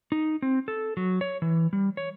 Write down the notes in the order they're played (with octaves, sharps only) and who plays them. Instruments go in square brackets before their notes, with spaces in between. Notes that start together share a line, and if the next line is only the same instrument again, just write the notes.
[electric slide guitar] D#4
C4
A4
F#3
C#5
E3
G3
C#5